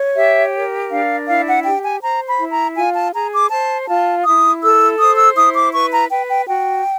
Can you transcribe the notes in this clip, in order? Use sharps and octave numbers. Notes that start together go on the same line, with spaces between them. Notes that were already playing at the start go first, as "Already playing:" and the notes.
Already playing: C#5
G4 E5
A#4
D4 F5
E4 F5
F#5
G4 G5
G#5
C5 A#5
B5
E4
A#5
F4 G#5
A5
G#4 A#5
D6
C5 A5
F4 A5
E4 D#6
A4 E6
C5 D#6
E6
E4 D#6
D6
B4 C#6
A#5
B4 G5
G5
F#4 G5